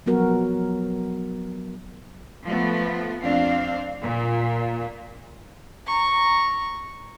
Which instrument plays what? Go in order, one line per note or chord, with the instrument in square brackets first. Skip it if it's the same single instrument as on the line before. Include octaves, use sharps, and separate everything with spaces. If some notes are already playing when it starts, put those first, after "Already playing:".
[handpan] F3 F#3 B3 F#4 A#4
[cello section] F3 A3 B3
F2 C4 D4 F5
A#2
[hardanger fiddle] A#5 C#6